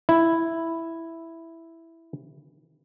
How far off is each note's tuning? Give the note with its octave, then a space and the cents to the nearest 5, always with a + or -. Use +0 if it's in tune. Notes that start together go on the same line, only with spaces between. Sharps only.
E4 +0